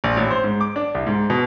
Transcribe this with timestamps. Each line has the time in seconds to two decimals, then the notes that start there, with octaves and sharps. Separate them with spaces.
0.04 A#1
0.17 A1
0.31 C5
0.44 G#2
0.61 D6
0.76 D4
0.94 C2
1.07 G#2
1.30 B2